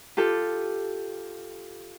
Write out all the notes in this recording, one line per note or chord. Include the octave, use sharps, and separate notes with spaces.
F4 G4 A4